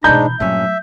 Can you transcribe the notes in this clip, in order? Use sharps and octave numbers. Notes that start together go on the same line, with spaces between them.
G#2 B2 E3 D4 D#4 A#5 B5 G6
G2 A#2 F#3 A3 C#4 E5